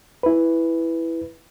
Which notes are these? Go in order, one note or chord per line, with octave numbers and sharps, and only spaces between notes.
E4 B4